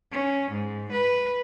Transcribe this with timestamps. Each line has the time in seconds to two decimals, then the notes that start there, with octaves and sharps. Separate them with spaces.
0.12 C#4
0.52 G#2
0.93 B4